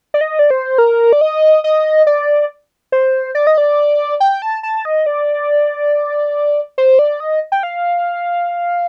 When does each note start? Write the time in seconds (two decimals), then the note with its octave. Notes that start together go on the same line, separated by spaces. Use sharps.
0.14 D5
0.21 D#5
0.39 D5
0.50 C5
0.78 A#4
1.13 D5
1.21 D#5
1.64 D#5
2.07 D5
2.92 C5
3.35 D5
3.47 D#5
3.58 D5
4.20 G5
4.42 A5
4.63 A5
4.85 D#5
5.06 D5
6.78 C5
6.99 D5
7.20 D#5
7.52 G5
7.63 F5